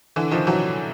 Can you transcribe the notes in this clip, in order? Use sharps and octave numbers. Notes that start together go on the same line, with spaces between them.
D3 E3
D#3 F3
E3 F#3